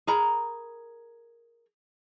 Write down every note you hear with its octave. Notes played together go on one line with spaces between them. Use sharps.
G#4 A#4 A#5 B5